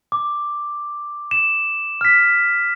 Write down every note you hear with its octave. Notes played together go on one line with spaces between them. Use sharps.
D6
E7
F6 B6